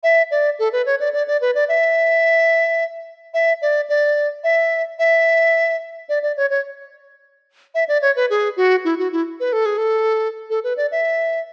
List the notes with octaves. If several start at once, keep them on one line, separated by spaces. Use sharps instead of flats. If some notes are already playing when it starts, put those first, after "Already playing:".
E5
D5
A4
B4
C#5
D5
D5
D5
B4
D5
E5
E5
D5
D5
E5
E5
D5
D5
C#5
C#5
E5
D5
C#5
B4
G#4
F#4
E4
F#4
E4
B4
A4
G#4
A4
A4
B4
D5
E5